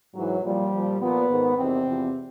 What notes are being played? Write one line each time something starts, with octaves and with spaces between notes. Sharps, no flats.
G#2 E3 F#3
A#2 F3 G3
A#2 F3
A#2 F3 B3
G#2 D#3
E2 C3 D#3 C4
E2 C3 F3